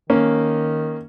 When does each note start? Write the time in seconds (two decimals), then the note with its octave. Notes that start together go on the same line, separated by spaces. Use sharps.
0.10 D#3 A#3 C#4